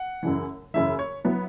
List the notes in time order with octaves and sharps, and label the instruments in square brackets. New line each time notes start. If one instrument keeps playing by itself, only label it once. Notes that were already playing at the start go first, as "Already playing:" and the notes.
Already playing: [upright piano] F#5
[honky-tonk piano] F#2 C#3 E3
[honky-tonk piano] F#2 C#3 E3 [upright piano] E5
[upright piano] C#5
[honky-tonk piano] F#3 B3 E4